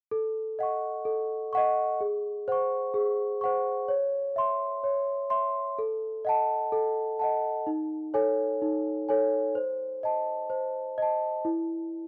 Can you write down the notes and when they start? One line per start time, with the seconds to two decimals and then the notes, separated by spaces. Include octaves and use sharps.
0.11 A4
0.59 D#5 F#5 C#6
1.05 A4
1.53 D#5 F#5 C#6
2.01 G#4
2.48 C5 F#5 C#6
2.94 G#4
3.41 C5 F#5 C#6
3.88 C#5
4.36 E5 C6
4.84 C#5
5.30 E5 C6
5.79 A4
6.25 D#5 F#5 A5
6.72 A4
7.19 D#5 F#5 A5
7.67 D#4
8.14 A4 C#5 G#5
8.62 D#4
9.09 A4 C#5 G#5
9.55 C5
10.03 D#5 A5
10.50 C5
10.98 D#5 A5
11.45 E4